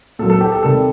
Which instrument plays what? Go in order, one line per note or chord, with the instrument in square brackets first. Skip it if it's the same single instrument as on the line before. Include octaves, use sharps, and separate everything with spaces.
[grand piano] A#2 A4
F#3
A4
G4
A4
C3 D#3 G3 A4